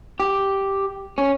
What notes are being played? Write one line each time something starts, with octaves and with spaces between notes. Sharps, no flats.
G4
C#4